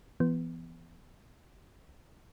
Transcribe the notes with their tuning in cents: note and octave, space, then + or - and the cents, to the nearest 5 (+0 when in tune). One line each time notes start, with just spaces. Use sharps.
E3 +30 B3 +0